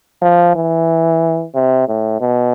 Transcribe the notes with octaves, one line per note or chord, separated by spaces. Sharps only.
F3
E3
C3
A2
B2